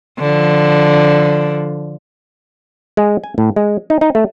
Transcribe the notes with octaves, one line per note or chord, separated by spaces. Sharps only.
D3 F3
G#3
G#5
A2
G#3
D#4
D#4
A3